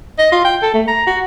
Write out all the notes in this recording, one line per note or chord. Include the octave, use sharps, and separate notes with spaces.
D#5
F4
G5
A4
A3
A#5
F#4